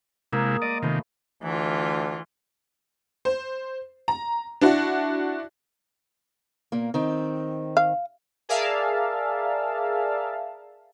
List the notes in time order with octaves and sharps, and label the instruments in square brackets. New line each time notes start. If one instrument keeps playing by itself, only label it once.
[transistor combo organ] C3 G#3 E4 [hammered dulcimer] A#3 G#4 A#4
[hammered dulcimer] G#3 [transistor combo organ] D5 D#5
[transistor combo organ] C3 D#3 [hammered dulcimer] F3 A3 B5
[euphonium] D2 [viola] E3 F4
[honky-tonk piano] C5
A#5
D4 E4 F#4
[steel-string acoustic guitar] A#2 A#3
D#3 C4
[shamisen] F5
[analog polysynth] G#4 A#4 D5 E5 F5 A5